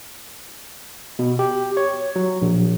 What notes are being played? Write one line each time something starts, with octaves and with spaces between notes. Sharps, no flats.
B2
G4
C#5
F#3
A#1